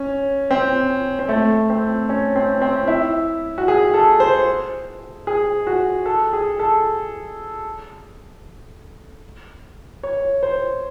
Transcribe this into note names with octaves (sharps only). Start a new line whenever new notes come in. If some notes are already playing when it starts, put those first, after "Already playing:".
Already playing: C#4
C4
C4
A3
C4
C#4
C4
C4
E4
F#4
G#4
A4
C5
G#4
F#4
A4
G#4
A4
C#5
C5